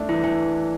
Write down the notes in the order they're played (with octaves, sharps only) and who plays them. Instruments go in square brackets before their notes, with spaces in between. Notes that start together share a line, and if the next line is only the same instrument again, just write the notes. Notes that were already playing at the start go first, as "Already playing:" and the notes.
Already playing: [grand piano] A3 D4 E5
[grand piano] E3 [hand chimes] E4
[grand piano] E3 [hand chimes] E4